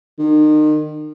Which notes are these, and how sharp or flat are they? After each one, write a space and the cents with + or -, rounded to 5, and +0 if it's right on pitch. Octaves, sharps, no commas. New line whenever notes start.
D#3 -35